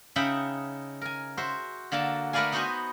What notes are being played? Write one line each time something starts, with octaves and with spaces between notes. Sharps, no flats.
C#3 D#4 E5 F#5 G5 B5
A#4 G#5
F#4 C5 E5
D3 A#3 F#4 A5
A3 A#4 B4 D5 F5 G#5
B3 D#4 F#4 B4 C5 G#5